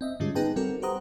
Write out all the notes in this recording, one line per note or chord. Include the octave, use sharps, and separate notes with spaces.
C4 D#5 E5
G#2 D3 G3 G#3 C#4 F4
B3 D#4 G#4 B4 G5 A5
G3 C4 F#4 A4 A#4
G4 B4 C5 F#5 A#5 D#6